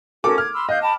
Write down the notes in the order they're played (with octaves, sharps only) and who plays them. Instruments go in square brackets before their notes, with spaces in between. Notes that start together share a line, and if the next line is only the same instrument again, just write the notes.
[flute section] C#4 F#4 [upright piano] A4 A#4 D6
[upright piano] F6 [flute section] G#6
[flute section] B5 C6 E6
[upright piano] D#5 [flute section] F5 F#6 G6
[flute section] G5 A5 B5